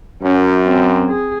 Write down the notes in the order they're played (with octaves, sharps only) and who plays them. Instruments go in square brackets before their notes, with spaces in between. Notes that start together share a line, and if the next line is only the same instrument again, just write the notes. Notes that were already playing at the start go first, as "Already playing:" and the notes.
[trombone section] F#2 [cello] C#4
[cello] C4
G#4